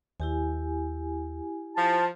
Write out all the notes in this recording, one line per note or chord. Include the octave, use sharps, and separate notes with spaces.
D#2 E4 G4 G#5
F3 A5